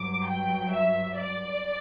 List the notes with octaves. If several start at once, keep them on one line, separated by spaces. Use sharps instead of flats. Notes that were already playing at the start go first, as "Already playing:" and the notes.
Already playing: G2 F#3 D6
G5
E5
D5